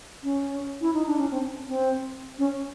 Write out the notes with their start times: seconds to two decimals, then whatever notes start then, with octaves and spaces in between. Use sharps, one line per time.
0.24 C#4
0.81 E4
0.94 D#4
1.07 D4
1.18 C#4
1.31 C4
1.68 C4
2.39 C#4